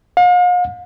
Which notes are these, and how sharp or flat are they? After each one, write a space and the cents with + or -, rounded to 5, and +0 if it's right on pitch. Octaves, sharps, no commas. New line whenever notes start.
F5 +45